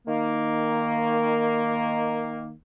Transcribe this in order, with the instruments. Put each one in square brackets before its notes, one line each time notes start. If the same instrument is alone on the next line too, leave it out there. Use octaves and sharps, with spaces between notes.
[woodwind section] D#3 A#3